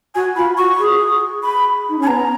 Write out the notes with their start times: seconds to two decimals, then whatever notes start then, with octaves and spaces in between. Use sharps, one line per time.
0.15 F#4 G#5
0.36 F4 B5
0.57 F#4 C#6
0.79 G#4
1.43 B5
1.89 D#4
1.98 C#4
2.03 G#5
2.07 B3 A#5